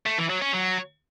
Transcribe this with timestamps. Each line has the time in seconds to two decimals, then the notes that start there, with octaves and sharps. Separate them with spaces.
0.06 A3
0.18 E3
0.30 F#3
0.41 C#4
0.53 F#3